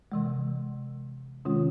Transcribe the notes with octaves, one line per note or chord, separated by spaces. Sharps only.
C3 E3 G#3
C3 D#3 G#3 C#4 F4